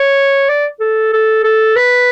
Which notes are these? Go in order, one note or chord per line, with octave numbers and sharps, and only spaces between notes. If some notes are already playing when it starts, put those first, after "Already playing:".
Already playing: C#5
D5
A4
A4
A4
B4